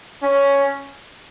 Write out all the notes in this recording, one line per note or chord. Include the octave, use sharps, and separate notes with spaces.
C#4